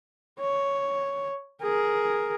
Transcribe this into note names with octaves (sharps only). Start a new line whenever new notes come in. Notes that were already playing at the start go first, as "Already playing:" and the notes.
C#5
G#4 A#4